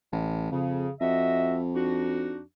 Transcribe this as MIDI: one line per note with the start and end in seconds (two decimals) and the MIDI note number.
0.12 0.51 33
0.52 0.87 41
0.52 0.91 49
1.01 2.41 41
1.01 1.58 66
1.01 1.58 75
1.01 1.58 76
1.75 2.41 62
1.75 2.41 63
1.75 2.41 66